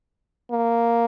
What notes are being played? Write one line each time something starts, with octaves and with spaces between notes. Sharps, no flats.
A#3